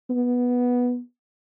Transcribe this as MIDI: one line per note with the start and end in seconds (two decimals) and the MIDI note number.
0.10 0.99 59